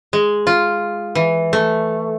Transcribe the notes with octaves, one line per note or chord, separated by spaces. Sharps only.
G#3
F4
E3
A3